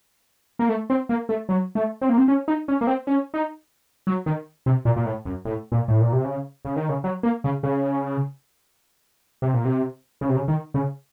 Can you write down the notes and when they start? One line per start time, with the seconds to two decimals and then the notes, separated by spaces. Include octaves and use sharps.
0.59 A#3
0.69 A3
0.90 C4
1.09 A#3
1.29 A3
1.49 F#3
1.75 A3
2.01 C4
2.09 A#3
2.18 C4
2.28 C#4
2.48 D#4
2.68 C#4
2.81 A#3
2.87 C4
3.07 C#4
3.34 D#4
4.07 F#3
4.26 D#3
4.66 C3
4.85 A#2
4.96 A#2
5.06 A2
5.26 F#2
5.45 A2
5.72 A#2
5.88 A2
6.01 A#2
6.13 C3
6.25 C#3
6.65 C#3
6.76 D#3
6.89 C#3
7.04 F#3
7.23 A#3
7.44 C#3
7.63 C#3
9.42 C3
9.54 A#2
9.65 C3
10.21 C#3
10.29 C3
10.36 C#3
10.48 D#3
10.74 C#3